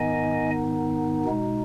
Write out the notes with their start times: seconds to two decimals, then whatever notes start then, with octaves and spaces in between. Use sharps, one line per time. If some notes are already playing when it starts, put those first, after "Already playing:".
Already playing: G#2 D#3 B3 D#4 D#5 G#5
1.25 B2 G#3 D#4